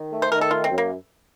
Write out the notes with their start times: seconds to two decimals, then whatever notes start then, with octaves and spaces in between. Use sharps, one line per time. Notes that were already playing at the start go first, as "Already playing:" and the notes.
Already playing: D#3
0.13 A3
0.22 C5
0.32 D#3 A#4
0.41 A4
0.51 A3 F4
0.64 C4
0.71 F#2
0.78 A#3